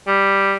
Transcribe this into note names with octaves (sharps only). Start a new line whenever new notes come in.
G3